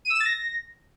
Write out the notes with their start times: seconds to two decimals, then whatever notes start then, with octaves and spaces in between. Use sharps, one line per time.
0.05 D#7
0.10 E6
0.15 E7
0.20 A6
0.25 A#6